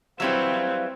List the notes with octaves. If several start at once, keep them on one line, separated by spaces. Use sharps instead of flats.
F#3 G3 C4 E4 B4 C#5 E5 F5